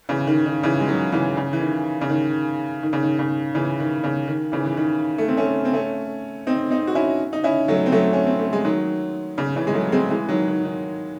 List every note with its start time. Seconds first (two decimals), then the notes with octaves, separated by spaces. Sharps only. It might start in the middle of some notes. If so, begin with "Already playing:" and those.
0.09 C#3 E3
0.27 D#3
0.46 D#3
0.63 C#3 E3
0.80 G#3
0.88 D#3 F#3
1.12 C#3 E3
1.37 C#3
1.53 E3
1.61 D#3
2.01 C#3
2.09 D#3
2.83 D#3
2.93 C#3
3.03 D#3
3.19 C#3
3.55 C#3 E3
3.80 D#3
4.04 C#3
4.28 D#3
4.52 C#3 E3
4.66 E3
4.77 D#3
5.18 A3
5.28 C4
5.37 A3 C#4
5.65 C4
5.73 A3 C#4
6.47 C4 D#4
6.70 C4 D#4
6.87 F#4
6.95 C#4 E4
7.33 D#4
7.44 C#4 E4
7.68 F#3 A3
7.86 C4
7.92 F#3 A3
8.13 C#4
8.26 C4
8.39 A3
8.53 G#3
8.65 D#3 F#3
9.38 C#3
9.56 C#3 E3
9.67 G#3
9.74 F#3 A3
9.92 G#3 C4
10.10 E3 G#3
10.29 D#3 F#3
10.48 D#3
10.65 D#3